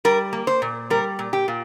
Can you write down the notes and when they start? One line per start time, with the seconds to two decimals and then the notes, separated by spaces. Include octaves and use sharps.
0.05 G3 A#4
0.33 A#3
0.47 C5
0.62 A#2
0.90 G3 A#4
1.19 A#2
1.33 G4
1.48 A#2